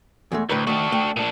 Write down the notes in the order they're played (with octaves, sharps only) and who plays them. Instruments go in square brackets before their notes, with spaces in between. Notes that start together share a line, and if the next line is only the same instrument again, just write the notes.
[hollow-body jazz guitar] E2 G#3 A3
[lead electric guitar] D2 [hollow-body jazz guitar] A2 B4 A#5
[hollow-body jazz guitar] D#3 A3 [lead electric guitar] D4 F#4
[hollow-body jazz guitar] A3 G5
[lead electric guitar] A#2 D4